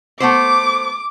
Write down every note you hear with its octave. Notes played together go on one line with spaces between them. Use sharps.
A3 B3 C5 D6